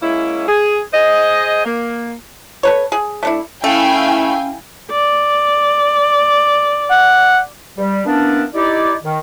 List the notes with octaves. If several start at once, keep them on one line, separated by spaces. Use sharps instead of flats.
G#3 A#3 C#4 E4
G#4
G#4 C5 D#5
A#3
A4 B4 C#5
G#4
A3 D4 E4
A3 C#4 E4 F5 G5 G#5
D5
F#5
G3
E3 A#3 B3 C#4 D4
D#4 E4 G4 D5
D#3